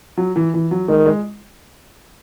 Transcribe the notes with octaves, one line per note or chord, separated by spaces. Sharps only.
F#3
E3
E3
F#3
D#3 G#3
G#3